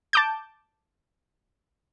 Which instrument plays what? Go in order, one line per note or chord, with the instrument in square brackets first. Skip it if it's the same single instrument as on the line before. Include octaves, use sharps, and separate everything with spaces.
[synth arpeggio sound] A5 D6 G6